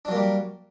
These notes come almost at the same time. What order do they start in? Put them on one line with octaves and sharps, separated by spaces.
D4 F#3 A#3 G3